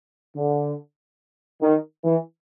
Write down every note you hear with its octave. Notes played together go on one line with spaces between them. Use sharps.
D3
D#3
E3